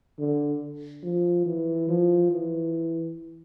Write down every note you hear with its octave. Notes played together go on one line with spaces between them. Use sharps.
D3
F3
E3
F3
E3